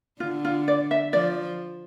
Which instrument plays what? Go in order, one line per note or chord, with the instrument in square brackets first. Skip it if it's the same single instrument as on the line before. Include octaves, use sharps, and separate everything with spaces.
[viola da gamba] D3 [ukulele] F4
[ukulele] F4
D5
E5
[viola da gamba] F3 [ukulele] D5